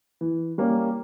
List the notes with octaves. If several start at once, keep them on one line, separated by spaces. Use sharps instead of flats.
E3
G3 A#3 C#4